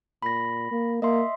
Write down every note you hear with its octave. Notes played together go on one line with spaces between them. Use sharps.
A#2 B5 A#6
A#3
A#3 D#5 E5 C6